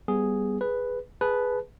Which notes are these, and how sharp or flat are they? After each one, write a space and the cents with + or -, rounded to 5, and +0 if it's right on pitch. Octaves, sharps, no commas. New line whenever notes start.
G3 +0 B3 +0 G#4 +0
G#4 +0 B4 +0
G#4 +0 B4 +0 A5 -25